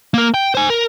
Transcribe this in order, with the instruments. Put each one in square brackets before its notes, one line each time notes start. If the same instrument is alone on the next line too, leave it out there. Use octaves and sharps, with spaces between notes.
[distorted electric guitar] A#3 A#4
G5
C5 G#5
A#4